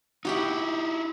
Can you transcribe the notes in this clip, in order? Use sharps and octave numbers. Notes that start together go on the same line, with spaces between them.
D#4 E4 F#4 G4 F#5